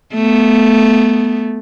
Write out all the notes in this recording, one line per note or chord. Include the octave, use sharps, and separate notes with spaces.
A3 B3